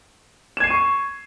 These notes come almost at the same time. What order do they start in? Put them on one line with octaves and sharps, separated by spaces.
E7 G#6 C7 D#7 C#6